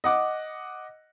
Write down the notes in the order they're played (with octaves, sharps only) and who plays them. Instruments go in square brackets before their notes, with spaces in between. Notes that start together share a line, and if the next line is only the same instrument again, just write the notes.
[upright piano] D#5 F#5 D6